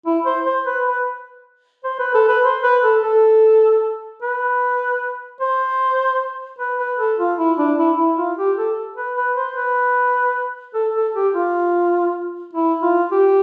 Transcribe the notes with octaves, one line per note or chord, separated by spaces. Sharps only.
E4
C5
C5
B4
B4
C5
B4
A4
B4
C5
B4
A4
A4
B4
C5
B4
B4
A4
F4
E4
D4
E4
E4
F4
G4
A4
B4
B4
C5
B4
A4
A4
G4
F4
E4
F4
G4